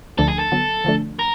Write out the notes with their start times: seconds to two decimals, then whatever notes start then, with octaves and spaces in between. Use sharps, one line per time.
0.18 D2 D3 F3 A3 D4 A4
0.28 G#4
0.39 A4
0.52 D3 F#3 B3
0.84 D3 F3 A3 D4
1.19 A#4